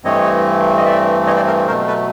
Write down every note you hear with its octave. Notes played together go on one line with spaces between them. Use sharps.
G2 E3 A3 C4 C#5 D#5
D#5
D5 E5
C#5 D#5
C5 D5
A#4 C5
B2 F#3 A3 A#4 C5
A4 B4